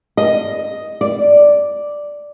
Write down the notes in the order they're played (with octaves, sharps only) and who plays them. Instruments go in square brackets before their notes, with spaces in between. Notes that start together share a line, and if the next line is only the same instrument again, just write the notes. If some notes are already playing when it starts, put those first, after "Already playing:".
[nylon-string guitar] D#5
D5